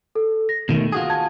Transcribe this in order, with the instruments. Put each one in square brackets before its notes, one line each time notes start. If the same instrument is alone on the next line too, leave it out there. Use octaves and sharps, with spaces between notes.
[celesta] A4
A#6
[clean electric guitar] B2 D#3 A3
F4 F#4 G#4
[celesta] A5 G#6